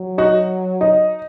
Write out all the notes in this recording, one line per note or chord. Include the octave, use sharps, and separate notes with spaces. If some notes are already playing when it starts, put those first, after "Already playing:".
Already playing: F#3
D#4 F#4
D#4